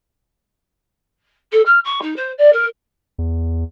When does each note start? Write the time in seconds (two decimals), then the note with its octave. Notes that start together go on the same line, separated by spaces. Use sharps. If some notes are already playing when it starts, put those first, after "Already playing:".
1.52 A4
1.65 F6
1.84 C#6
2.01 D#4
2.16 C5
2.38 D5
2.52 A#4
3.18 E2